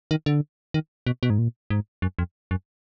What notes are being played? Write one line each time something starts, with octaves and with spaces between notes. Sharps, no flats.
D#3
D3
D#3
B2
B2
G#2
A#2
G#2
F#2
F2
F#2